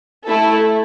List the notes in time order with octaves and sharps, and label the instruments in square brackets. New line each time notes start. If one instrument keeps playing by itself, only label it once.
[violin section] A3 E4 A4